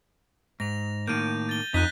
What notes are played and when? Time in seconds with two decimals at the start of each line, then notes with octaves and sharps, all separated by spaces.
0.60 G#2 A#6 F7
1.07 A2 D#3 A#3 G6 D#7
1.49 A6 G7
1.74 F2 D#4 F#6 G6 B6